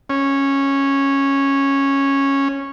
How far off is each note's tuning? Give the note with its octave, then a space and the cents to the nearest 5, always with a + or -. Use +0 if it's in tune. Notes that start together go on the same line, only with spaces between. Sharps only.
C#4 -10